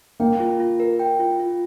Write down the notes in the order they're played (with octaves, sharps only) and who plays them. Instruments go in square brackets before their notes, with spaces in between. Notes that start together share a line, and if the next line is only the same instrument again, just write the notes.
[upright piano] A#3 [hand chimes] G5
[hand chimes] F4
F4
A#4
G5
F4
F4